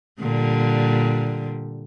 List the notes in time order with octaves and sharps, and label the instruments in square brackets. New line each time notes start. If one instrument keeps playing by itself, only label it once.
[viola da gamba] A#2 D3 G3